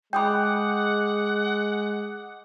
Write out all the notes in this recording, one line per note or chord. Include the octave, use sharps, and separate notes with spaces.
G#3 F#5 G5 B5 D6 D#6 G6